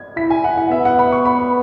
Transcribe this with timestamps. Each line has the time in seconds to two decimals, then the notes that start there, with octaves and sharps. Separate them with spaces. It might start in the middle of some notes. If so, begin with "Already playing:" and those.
Already playing: G#6
0.17 E4 B6
0.30 G#5
0.44 F#5
0.57 F#5
0.71 B3 E5
0.85 F#5
0.99 B5
1.12 C#6
1.25 B5